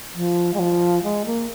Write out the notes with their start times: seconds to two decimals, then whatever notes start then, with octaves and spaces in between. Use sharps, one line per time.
0.14 F3
0.53 G#3
0.59 F3
1.03 G#3
1.25 A#3